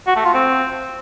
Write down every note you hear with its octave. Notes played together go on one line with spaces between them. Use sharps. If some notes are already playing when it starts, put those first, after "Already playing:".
F#4
A3
F4
C4